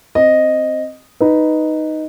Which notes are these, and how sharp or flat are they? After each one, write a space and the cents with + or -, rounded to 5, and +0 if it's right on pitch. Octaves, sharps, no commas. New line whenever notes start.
C4 +0 D#5 -5
D#4 +0 B4 +0